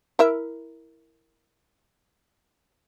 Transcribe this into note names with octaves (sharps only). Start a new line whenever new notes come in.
E4 A#4 E5